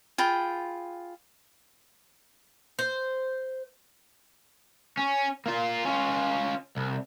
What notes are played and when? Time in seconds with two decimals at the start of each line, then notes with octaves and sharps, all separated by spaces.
0.18 F4 G#4 G5 B5
2.79 C5
4.97 C#4
5.46 A#3 F4
5.85 C#4 F4
6.77 C2